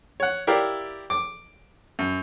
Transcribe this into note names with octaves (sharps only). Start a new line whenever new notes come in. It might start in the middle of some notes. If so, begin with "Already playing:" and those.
C#5 F#5
E4 G4 A#4 D5 E5 F5
D6
F#2